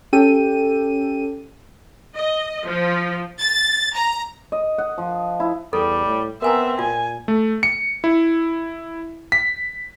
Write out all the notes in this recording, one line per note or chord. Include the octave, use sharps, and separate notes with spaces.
C#4 G4 A4 G5 D#7
D#5
F3
A6
A#5
D#5
F#5
F3
E4
E2 G3 A4
A2
B3 C4 A#4 E5 G#5 A#5
A#2 F4 G#5
A3
C#7
E4
B6